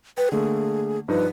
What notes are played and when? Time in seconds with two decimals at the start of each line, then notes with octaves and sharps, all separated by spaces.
0.18 B4 G5
0.32 D3 A3 A#3 G#4
1.08 G2 F3 D#4 B4